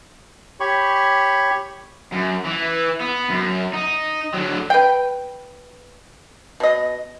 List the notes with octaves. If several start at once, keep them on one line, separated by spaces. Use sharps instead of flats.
G4 C#5 B5 C#6
F#2
E3
B3
F#2
D#4
D3 F#3
B4 G5
B2 D#5